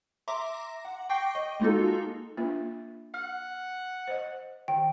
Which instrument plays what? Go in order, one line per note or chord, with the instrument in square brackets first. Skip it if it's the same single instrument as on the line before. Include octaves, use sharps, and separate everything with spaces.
[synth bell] E5 A#5 C6 D6 A#6
F#5
G5 C#6 D6 G6 A#6 C7
D#5
G#3 A#3 D#4 F4 F#4 A4
[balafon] A#3 D4 F4 [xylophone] E5
[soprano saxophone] F#5 [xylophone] F6
[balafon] C5 D#5
[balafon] D#3 [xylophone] G5